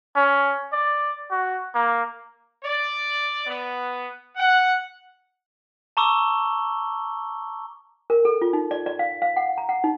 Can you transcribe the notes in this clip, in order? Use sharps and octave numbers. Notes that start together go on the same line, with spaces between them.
C#4
D5
F#4
A#3
D5
B3
F#5
A5 A#5 C#6 D6 E6 G7
A#4
A4
F4
D#4
D5
D5
F5
F5
F#5
A#5
F#5
D#4